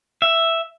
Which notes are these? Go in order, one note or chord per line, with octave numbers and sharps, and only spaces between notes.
E5